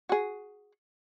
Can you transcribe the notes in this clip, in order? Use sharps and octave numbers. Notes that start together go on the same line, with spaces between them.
F#4 G#4